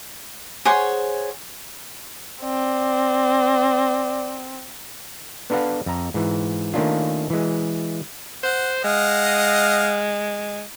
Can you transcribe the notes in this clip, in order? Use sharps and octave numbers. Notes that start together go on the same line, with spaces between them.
G#4 C5 C#5 F#5
C4 D5
B3 D4 A4 B4 F5 F#5
F2 A#5
G#2 E3
D#3 A3 A#3 C#4 D4 F4
E3 G#3
C5 F#5
G#3 D#5 F5 F#5